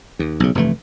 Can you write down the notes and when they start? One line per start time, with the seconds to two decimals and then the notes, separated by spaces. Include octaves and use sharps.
0.19 D#2
0.40 B1 C#3
0.55 F1 G2 E3 A3